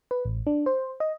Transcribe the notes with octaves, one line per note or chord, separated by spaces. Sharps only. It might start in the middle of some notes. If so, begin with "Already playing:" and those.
B4
A1
D4
C5
D#5